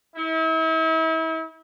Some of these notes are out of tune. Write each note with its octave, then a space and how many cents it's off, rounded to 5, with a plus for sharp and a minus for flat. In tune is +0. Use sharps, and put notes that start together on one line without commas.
E4 -40